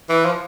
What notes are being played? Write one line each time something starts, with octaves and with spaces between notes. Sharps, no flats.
E3
F3